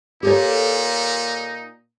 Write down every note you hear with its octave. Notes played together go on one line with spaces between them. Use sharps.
A#2 D#4 G4 A4 C#5